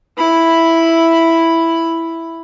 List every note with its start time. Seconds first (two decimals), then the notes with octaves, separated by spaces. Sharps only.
0.18 E4 B5